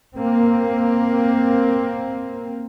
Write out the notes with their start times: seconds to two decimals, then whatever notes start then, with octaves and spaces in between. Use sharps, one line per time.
0.16 A#3 C4